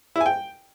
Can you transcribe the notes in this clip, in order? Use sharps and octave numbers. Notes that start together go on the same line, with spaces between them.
E4
G#5
G5